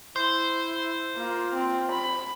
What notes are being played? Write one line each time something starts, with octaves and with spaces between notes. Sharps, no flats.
E4 C5
A#3 F4
C4
B5